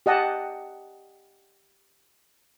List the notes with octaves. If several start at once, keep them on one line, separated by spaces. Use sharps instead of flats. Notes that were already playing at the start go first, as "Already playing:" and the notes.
G4 D#5 F#5 A5